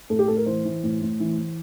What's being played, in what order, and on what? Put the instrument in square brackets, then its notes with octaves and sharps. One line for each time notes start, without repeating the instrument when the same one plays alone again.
[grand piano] A2 A4
G4
A2 A4
A#4
E3 C5
E3
A2
A2
E3
E3